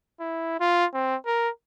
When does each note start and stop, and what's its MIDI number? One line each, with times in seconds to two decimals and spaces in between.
0.20 0.57 64
0.60 0.86 65
0.94 1.16 60
1.26 1.49 70